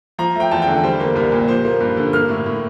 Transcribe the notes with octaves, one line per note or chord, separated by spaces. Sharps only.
F3 A#5
A3 G5
E2 A5
G5
D3
G3 C5
A#3
C2 A#4
A#2
F3 C5
A#3
G2
D3
A#3 F6
A2
A2